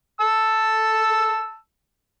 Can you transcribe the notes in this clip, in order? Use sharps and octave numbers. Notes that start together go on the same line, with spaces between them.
A5 E6